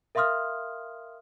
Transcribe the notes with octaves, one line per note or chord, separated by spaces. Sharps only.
A#4 E5 F5 C6 D#6 F6